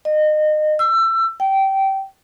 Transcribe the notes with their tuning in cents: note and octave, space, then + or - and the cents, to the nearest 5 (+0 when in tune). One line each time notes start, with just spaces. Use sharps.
D#5 -30
E6 +25
G5 -20